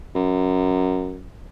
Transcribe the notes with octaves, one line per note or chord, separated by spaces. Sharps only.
F#2